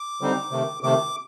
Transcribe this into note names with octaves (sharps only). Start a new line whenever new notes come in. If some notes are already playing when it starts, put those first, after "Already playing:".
Already playing: D6
D3 G3 C4 D#4
C3 D#3 A3
C3 D#3 A3 D6